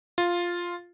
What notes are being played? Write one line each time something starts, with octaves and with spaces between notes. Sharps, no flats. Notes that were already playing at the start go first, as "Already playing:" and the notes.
F4